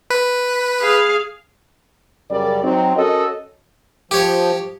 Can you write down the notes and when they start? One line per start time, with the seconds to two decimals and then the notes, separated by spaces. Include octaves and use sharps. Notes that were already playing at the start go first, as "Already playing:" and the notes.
0.10 B4
0.81 G#4 F5
2.31 F#2 C#3 G3 A#4 D5
2.64 F#3 C4 D#4
2.97 C#4 F#4 A4 A#4 C#5 D#5
4.11 F3 G4 C#5